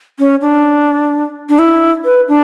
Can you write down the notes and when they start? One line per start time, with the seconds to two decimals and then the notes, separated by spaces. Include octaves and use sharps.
0.19 C#4
0.41 D4
1.49 D4
1.59 E4
2.05 B4
2.29 D4